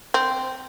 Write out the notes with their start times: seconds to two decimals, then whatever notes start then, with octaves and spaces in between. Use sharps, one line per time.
0.14 C4